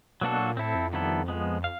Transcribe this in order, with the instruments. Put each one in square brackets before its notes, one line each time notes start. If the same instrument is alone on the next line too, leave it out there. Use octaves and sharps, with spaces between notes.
[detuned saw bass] B2 [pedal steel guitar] F#3 A#3 D4 F#4 A4
[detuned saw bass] A#2
[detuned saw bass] A2 [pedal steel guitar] C4 E4 A4
[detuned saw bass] F2
[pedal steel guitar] D#3 G3 B3 E4 A4
F3 G#3 B3
F5